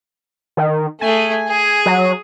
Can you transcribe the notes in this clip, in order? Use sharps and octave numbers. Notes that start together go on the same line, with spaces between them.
D#3
A3 G#4 G#5
G#4
F#3